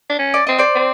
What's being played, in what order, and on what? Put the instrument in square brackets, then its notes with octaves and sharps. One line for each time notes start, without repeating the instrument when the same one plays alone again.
[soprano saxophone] D4
C#4
[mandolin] D5
[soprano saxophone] C4 [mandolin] D#5
[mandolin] C5 D5
[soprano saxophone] C4